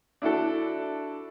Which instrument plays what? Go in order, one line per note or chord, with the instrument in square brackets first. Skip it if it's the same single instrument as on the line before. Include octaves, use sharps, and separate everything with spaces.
[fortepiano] D4 E4 F#4 A4